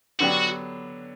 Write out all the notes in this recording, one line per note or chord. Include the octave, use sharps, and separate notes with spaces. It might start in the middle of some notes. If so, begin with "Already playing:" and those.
D3 F#3 B3 D4 F#4 G4